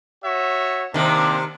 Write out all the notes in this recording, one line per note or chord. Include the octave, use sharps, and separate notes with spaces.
F#4 C#5 E5
C3 D#3 A#3 C4 D4